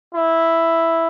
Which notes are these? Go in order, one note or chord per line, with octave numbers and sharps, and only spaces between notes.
E4